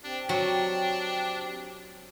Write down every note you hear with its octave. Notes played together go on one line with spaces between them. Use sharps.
C4 D4 G4
F#3 D4